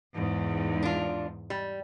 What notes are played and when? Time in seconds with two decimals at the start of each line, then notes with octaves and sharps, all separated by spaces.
0.15 E2 G#2
0.83 D4 F4
1.50 G3